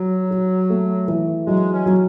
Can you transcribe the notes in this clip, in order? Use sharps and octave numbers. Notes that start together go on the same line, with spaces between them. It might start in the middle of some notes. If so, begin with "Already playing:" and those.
Already playing: F#3 F#4
F#4
A3
E3
F#3 G#3
C#4
F#3